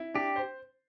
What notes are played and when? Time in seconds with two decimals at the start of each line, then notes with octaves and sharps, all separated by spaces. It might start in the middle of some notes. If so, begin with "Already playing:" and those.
Already playing: E4
0.14 D4 G4
0.36 C5